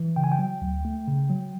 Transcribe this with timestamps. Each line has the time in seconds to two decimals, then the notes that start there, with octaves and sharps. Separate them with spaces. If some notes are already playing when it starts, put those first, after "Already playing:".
Already playing: E3
0.16 C#3 G5
0.24 G#5
0.32 G5
0.39 F#3
0.61 D2
0.85 A3
1.07 C#3
1.30 F#3